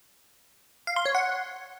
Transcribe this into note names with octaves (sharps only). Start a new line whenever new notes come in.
F5
C6
C#5
F#5